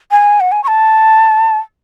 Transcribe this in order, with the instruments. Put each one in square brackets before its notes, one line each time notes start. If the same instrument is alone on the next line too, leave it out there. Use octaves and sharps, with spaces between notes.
[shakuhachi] G#5
F#5
G#5
C#6
A5